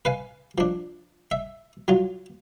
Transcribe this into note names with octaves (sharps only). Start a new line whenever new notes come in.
B4 F5 G#5
F3 D4
E5
F#3 F4